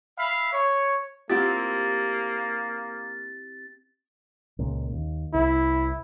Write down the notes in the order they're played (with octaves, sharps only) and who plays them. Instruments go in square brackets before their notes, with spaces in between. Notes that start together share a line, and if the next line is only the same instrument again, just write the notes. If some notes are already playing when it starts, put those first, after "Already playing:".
[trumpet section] E5 F5 B5
C#5
[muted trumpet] A#3 [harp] C4 E4 G4 [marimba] F4 F#5 [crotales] A6
[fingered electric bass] C#2 A#2
D#2
[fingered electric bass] C2 [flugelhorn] E4